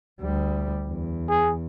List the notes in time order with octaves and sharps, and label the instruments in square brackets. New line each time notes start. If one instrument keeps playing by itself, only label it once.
[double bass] D2 G3
E2
[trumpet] G#4